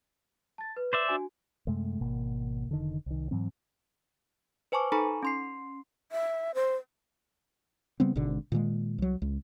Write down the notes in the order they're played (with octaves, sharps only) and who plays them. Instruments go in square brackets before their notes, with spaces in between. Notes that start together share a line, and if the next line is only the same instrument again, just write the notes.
[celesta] A5 A6
B4
[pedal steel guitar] C5 D5 E5
[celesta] D4 F#4 G#5
[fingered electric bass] F#2 C3 G#3 A3
G#1 B2 A#3
F1 D3 D#3
C2 D#3
G#2 E3 F#3 C4
[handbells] B4 C5 G#5 A5 C#6 D6
D#4 A4 G#5 A#5 B5 C#6
C#4 C6 C7
[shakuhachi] E5
C5
[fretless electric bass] C#3 G3 B3 C4
G#1 G#2 B2 D3
A#2 D#3 E3 G#3
C2 F#3
C#2